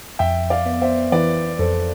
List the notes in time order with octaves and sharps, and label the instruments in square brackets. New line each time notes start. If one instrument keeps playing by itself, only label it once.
[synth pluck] F2 [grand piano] E5 G5
[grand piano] D5 F5
[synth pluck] B3
[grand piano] C5 E5
[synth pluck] E3 [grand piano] B4 D5
[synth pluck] F2 [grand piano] A4 C5